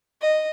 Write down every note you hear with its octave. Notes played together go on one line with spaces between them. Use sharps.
D#5